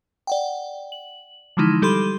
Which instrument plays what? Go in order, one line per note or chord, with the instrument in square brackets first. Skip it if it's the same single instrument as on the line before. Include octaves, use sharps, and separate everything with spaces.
[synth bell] D5 F#5 G5
F#7
D3 E3 F3 G#3 D#4 E4
G3 G4 A4 B5 C6 D#7